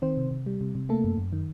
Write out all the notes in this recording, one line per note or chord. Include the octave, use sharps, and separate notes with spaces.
D#3 C4 C5
C3
C3
G3
C3
C3
A3 A#3 A4
F#2
F#2
D#3